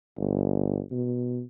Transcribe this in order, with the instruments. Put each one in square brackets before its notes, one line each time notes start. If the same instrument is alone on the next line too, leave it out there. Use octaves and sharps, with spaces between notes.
[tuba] G1
B2